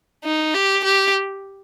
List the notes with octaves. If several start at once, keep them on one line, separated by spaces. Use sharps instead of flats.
D#4
G4
G4